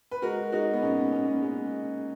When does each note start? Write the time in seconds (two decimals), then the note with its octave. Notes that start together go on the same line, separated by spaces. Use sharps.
0.11 B4
0.22 G#3 F#4 A#4
0.52 G#3 D#4 F#4
0.73 B3
0.82 A#2 C#4
0.98 B3
1.12 A#2 C#4
1.28 B3
1.42 G#3 C#4